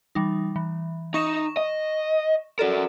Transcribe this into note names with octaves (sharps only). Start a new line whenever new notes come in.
E3 G3 D#4
E3
D#4 C#6 A#6 E7
D#5
F#4 A4 A#4 D5